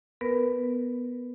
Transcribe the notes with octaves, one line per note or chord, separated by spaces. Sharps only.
B3 A#4 B4